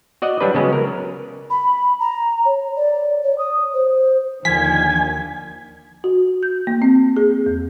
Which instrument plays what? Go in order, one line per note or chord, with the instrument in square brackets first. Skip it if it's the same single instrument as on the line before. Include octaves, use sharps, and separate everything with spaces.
[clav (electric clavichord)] F#4 D5 D#5 F#5
F#3 G3 D4 B4
C#3 F#3 G#3 B3 C#4
A#4
[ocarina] B5
A#5
C#5
D5
C#5
D#6
C5
[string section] D#2 D3 D#3 [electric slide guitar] F3 [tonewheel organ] G#5 [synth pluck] B6
[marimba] F#4
G6
A#3
C4
G#4
E2